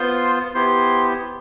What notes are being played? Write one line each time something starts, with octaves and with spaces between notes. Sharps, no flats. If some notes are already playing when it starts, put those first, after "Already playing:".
Already playing: B3 F4 C5 C6
B3 E4 G4 C5 C6